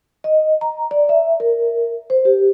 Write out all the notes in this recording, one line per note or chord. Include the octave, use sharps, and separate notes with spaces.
D#5
A#5
D5
E5
A#4
C5
G4